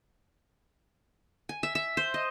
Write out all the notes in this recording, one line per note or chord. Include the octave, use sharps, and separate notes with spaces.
G#5
E5
E5
C5
D#5